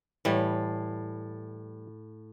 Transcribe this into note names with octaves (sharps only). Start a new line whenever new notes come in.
A2 E3 G3